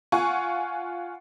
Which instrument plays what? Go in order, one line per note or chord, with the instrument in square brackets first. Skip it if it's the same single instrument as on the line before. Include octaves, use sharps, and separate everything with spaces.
[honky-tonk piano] F4 F#5 G#5 C#6